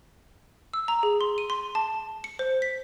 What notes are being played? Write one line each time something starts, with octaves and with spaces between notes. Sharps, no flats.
E6
A#5
G#4
C6
D#7
C6
A5
C#7
C5
B6